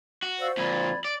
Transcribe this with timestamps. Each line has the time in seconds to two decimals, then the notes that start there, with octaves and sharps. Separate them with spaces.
0.23 F#4
0.39 C5 D5 F5 E6
0.57 F2 A#2 D5 B5 G#6
1.05 D5